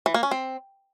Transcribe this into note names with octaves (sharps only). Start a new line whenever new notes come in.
E3
A#3
C#4
C4